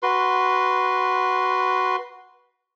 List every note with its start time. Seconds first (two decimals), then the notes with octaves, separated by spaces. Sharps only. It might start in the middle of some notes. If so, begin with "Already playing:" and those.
0.03 F#4 B4 C6